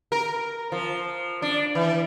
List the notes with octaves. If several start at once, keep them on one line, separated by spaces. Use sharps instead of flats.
A#4
F3
D4
E3